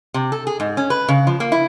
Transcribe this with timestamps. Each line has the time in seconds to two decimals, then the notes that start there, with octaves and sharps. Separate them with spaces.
0.14 C3
0.32 A4
0.47 G#4
0.60 G#2
0.77 C#4
0.90 B4
1.08 C#3
1.27 F3
1.40 A#3
1.52 E4